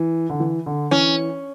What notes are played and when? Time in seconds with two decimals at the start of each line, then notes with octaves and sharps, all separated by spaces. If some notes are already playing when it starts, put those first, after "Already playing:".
Already playing: E3
0.30 D3
0.40 E3
0.66 D3
0.91 E3 C#4